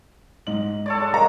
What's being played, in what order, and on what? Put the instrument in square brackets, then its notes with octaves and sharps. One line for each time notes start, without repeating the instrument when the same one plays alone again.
[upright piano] G#2 D#5 F#7
[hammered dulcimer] A4 C#5 D5
G#3
[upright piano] A#4 D#5 F5 [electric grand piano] A#5